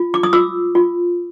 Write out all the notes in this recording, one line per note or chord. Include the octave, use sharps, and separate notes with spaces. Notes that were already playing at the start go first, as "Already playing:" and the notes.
Already playing: F4
D6
D#6
F4 D6 E6
F4